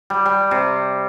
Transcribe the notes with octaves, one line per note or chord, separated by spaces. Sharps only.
G3
G3
C3